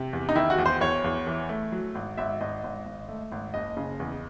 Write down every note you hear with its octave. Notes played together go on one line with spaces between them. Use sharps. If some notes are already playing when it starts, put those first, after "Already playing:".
Already playing: C3
E2
D#4
D#3 E4
F#4
E2
C5
E2 C#5
E2
E3
A3
F#3
G#1
G#1 E5
G#1 D#5
G#1
G#1
A3
G#1
F#1 D#5
C#3
E2